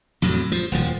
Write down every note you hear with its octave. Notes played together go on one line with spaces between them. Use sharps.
F2 A2 F#3
F3
D#1 F3